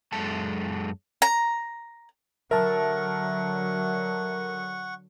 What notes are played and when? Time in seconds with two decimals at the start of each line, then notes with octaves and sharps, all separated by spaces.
0.12 F#2 G#3 A4 A5
1.22 A#5
2.51 D3 F#3 A#4 E5 F#5 A5 C#6